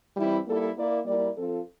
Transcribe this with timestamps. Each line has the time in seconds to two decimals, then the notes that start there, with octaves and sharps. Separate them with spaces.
0.16 E3 G3 C4 E4
0.47 G3 A#3 E4 A4
0.76 A#3 E4 A#4 D5
1.05 G3 A#3 E4 A#4 D5
1.37 F3 C4 F4 A4